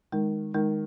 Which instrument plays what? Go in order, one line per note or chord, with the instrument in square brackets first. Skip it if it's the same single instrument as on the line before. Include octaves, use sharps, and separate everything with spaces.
[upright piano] D#3 [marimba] G#3
[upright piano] D#3 [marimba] G#3